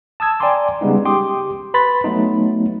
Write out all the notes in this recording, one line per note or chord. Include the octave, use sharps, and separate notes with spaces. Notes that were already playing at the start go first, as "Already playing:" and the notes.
A5 D#6 E6 G#6
D5 G5 G#5 A#5 C6 D6
C#3 G3 G#3 B3 D#4
G4 G5 C6 D6 D#6
B4 B5 C6 A6
F#3 A3 B3 D#4